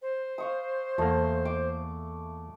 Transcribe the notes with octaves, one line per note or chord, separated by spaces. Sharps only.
C5
F5 C#6 D#6
E2 A3 A#3
D6